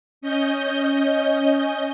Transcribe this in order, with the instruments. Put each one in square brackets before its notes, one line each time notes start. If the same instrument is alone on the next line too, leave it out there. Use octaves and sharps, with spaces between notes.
[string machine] C#4 D#5 G6